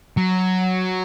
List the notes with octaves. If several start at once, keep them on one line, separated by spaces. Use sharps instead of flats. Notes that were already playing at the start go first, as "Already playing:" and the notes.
F#3